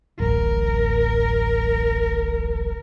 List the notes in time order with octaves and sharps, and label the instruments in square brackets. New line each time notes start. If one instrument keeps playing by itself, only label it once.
[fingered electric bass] D1 A1 [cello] A#4